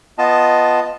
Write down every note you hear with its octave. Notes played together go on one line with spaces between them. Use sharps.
B3 F4 D#5 A5